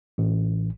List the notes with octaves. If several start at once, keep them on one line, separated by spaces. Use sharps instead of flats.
A1